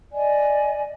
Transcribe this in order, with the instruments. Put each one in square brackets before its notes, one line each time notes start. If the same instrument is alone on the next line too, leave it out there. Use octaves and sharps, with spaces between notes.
[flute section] D5 D#5 G#5